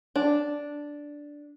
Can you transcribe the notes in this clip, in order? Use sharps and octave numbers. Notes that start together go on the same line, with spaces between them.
D4